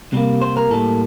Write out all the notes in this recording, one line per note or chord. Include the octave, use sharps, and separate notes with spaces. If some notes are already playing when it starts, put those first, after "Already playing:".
C3 G3 A#3
C5
A#4
A2 G3 A#3 A4